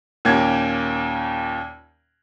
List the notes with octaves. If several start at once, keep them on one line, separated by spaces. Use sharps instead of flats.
D#2 A#2 A#3 C#4 G4 G#6